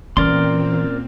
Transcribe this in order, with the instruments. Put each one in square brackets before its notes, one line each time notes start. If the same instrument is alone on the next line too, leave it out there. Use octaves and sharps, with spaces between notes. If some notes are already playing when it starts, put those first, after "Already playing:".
[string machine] A#2 C4 [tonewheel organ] E3 [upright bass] C#4 [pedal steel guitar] A#4 D5 C6